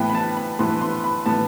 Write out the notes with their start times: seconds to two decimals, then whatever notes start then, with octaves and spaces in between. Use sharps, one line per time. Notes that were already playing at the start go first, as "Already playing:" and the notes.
Already playing: A2 E3 B3 G5
0.10 B5
0.15 A5
0.37 B5
0.59 A2 E3 B3 C6
0.81 C6
1.04 B5
1.26 A2 E3 B3 A5